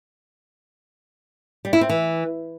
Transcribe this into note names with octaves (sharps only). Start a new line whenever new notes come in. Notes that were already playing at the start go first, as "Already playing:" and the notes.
G3
E4
C4
E3